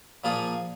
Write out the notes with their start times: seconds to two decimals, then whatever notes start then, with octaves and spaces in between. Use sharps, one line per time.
0.24 A#2 F3 A#3 F4 G#4